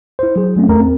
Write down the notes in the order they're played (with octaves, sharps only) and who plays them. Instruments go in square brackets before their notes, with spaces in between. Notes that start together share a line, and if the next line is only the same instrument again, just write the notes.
[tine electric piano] E4 C5
F#3 G#4
F#3 A3 C4 C#4
E2 A3 A#4 A#5
C4